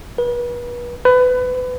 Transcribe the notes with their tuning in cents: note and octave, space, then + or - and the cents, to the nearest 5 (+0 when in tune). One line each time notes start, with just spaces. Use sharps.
B4 -35
B4 +25